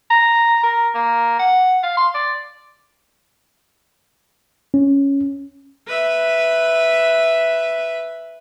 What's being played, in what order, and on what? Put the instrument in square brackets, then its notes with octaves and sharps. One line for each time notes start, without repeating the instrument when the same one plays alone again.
[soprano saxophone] A#5
A#4
A#3
F#5
F5
C6
D5
[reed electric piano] C#4
[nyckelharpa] B4 E5